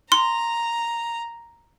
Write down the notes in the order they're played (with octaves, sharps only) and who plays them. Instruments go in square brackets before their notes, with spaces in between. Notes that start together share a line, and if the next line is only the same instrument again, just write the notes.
[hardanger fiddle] A#5 [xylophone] C6